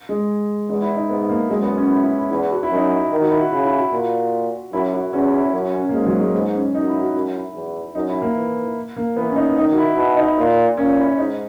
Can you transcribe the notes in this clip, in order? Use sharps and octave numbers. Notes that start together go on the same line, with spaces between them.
G#3
E2 G#3
E4
D#4
G#2 B3
A#3
F#2 G#3
B3
C#4
E4
E4
E4
E2 E4
F#4
E4
F#2 D#4
E4
D#3
F#4
E4
F#4
C#3 E4
E4
F#4
A#2
F#2 E4
F#4
E2 C#4
E4
F#2 F#4
C#4
A#3
G#2 G#3
F#3
G#3
G#2 B3
C#4
F#2 D#4
E4
F#4
F#2 E4
E4
E2
F#2 D#4
E4
A#3
E3
A#3
E3 B3
C#4
D#4
D#3 D#4
F#4
E4
B2 E4
D#4
A#2
A#2 C#4
E4
G#2 D#4